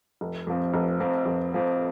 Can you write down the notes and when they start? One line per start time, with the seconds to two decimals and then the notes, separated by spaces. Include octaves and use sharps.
0.21 F1
0.47 F2 F3 C4
0.74 F1
1.00 F2 F3 C4
1.26 F1
1.52 F2 F3 C4